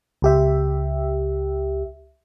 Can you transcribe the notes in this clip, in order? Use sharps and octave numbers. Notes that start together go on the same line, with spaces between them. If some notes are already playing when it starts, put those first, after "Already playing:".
C#2 G4 E5